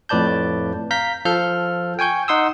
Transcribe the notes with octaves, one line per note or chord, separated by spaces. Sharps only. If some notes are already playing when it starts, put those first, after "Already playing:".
F2 A2 B4 D5 A5 G6
F5 A#5 G6 B6
F3 A4 F5 F6 G6
G5 G#5 C#6 G6
D#4 F#5 C6 D#6 E6